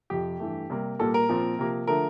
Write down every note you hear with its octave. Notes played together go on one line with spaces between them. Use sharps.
F2 C3 F3 G4
G2 E3 A3
C3 G3 A#3
A#2 G3 A#3 A4
A#4
A#2 F3 C4
C3 F3 A#3
D3 F3 A3 A#4